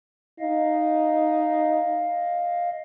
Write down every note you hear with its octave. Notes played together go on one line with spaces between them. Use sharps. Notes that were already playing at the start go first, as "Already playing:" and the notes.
D#4 D#5 F5